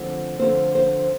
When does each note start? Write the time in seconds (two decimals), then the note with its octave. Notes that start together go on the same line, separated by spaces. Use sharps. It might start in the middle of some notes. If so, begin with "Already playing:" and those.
Already playing: D3 F3 A3 C4
0.39 D3 F3 A3 C4 C5
0.75 C5